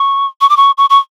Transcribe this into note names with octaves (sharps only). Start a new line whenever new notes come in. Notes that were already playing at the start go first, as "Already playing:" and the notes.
Already playing: C#6
C#6
D6
C#6
C#6
C#6